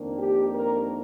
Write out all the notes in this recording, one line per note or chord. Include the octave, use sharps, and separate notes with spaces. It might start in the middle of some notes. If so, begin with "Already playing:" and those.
Already playing: F2 D#3 A#3 D4
G4
A#4